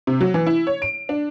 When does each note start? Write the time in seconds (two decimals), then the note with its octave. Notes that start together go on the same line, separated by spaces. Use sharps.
0.07 C3
0.21 F#3
0.34 E3
0.47 E4
0.67 C#5
0.82 D7
1.09 D4